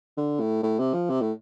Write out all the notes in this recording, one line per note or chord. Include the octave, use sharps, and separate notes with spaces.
D3
A2
A2
C3
F3
C3
A2